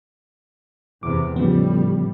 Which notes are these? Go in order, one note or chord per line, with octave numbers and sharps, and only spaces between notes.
E2 C3 B3 D6
A2 C#3 F3 G3 B3